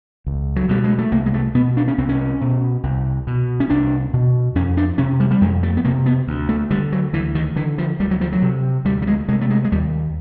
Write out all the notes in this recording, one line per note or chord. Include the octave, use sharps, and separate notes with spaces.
C#2
F#3
B2 G3
G#3
A3
C2 A#3
G#3
A3
B2 B3
D4
C#4
C2 C4
C#4
B2
C2
B2
C#4
C2 D4
B2
F2 C#4
D4
C3 C#4
G3
G3
F2 G#3
A3
B3
C3 A#3
B3
D2
A3
D3 G3
F#3
D2 E3
D#3
D3 E3
F3
D2 G3
F#3
F3
F#3
C3
D2 G3
G3
G#3
C3 G#3
A3
G#3
G#3
D#2 G3